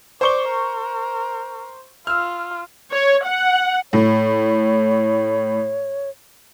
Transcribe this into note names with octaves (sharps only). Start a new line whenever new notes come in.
C5 D5 C#6 G7
A#4
F4 E6 F6
C#5
F#5
A2 C#5